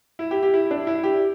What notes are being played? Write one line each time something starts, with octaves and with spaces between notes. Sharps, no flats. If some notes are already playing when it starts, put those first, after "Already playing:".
E4
G4
G4
E4
D4
E4
G4